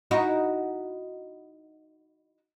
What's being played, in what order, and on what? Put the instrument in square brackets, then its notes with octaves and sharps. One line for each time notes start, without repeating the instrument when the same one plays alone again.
[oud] D#4 E4 F#4